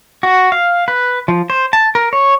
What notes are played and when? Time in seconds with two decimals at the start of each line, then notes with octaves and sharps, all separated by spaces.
0.23 F#4
0.52 F5
0.88 B4
1.28 F3
1.50 C5
1.73 A5
1.95 A#4
2.13 C#5